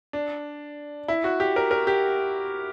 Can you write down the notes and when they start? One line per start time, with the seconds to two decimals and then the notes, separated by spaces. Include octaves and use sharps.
0.13 D4
1.08 E4
1.24 F#4
1.40 G4
1.56 A#4
1.71 A#4
1.87 G4